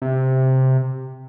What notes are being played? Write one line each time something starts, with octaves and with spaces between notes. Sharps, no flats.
C3